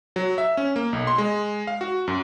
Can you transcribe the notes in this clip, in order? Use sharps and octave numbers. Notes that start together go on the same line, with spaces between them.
F#3
E5
C#4
A#3
B1
C6
G#3
F5
F#4
F#2